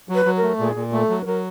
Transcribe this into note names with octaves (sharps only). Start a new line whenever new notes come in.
F#3
B4
F#3
A#4
A3
A#2 G#4
A#2
A3 A4
F#3
B4
F#3 A#4